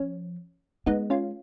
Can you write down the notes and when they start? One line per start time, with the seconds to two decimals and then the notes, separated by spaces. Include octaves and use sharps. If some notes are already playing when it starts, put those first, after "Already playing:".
Already playing: F3 C#4
0.86 G#3 B3 D#4
1.10 C#4 F4